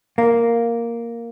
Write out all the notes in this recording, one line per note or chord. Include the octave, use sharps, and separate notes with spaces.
A#3